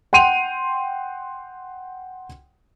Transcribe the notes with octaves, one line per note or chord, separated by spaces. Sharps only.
F#5 G5 C6 D#7 F7